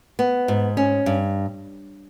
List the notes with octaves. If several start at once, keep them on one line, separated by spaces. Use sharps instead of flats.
B3
G#2
C#4
G2